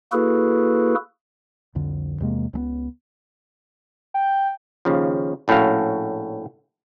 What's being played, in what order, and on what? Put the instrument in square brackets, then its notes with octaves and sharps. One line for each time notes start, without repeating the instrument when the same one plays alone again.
[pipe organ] A#3 E4 F#4 G#4 A4 B4
[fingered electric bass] C2 F2 D3
E2 C3 G#3 A#3
C#2 G#3 B3
[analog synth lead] G5
[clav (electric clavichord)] D#2 C#3 F3
A#1 A2 C#4 F#4 F5